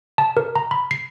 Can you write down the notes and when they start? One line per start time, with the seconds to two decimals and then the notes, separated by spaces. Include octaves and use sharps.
0.18 A5
0.37 A#4
0.56 A#5
0.71 B5
0.91 C7